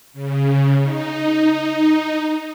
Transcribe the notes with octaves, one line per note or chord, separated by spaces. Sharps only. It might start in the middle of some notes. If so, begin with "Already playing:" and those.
C#3
D#4